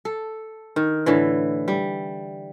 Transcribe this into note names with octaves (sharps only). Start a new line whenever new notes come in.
A4
D#3
A2 D3 E3
G3